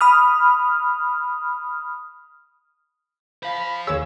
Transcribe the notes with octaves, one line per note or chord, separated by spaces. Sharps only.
B5 D#6 F6
C5 F5 B5
D#2 G#4 C#5 E6